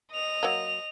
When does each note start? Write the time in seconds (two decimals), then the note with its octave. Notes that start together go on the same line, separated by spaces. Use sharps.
0.12 D#5 F7
0.43 F#3 A#3